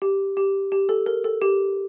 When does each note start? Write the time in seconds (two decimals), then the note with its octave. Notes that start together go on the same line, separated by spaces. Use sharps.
0.02 G4
0.37 G4
0.72 G4
0.89 A4
1.06 A#4
1.24 A4
1.42 G4